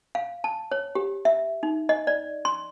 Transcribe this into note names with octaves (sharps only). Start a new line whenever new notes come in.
F5
A5
C#5
G4
E5
D#4
D#5
D5
C6